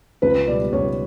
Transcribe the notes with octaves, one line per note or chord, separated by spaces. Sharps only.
C#2 B4
B2 G3 D5
C#2 C#5